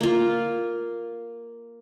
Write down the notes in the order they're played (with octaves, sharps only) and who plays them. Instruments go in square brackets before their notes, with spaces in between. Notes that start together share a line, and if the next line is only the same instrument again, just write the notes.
[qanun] A#3 F4